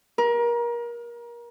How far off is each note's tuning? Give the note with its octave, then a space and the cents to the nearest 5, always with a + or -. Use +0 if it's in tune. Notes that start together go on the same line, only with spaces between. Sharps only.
A#4 +30